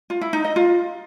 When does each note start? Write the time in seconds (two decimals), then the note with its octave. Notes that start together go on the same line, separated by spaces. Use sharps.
0.10 F4
0.21 E4
0.33 D#4
0.44 D#5
0.56 F4